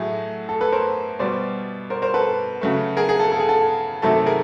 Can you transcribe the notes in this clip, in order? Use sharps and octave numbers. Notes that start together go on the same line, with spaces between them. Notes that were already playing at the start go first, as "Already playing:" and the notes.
Already playing: A2 F#3 A3 G#4
A4
A4 B4
A#4 C5
B2 G3 C5 D5
A#4 C5
A#4 C5
A4 B4
C#3 F#3 A3
G#4 A#4
G#4
A4
A4
G#4
A4
C3 D#3 F#3 A3 A4
G#4 A#4